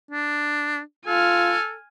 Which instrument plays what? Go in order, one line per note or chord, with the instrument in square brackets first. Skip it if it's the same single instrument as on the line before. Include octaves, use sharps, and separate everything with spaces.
[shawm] D4
[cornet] F4 [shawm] A4 [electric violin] G#5 F6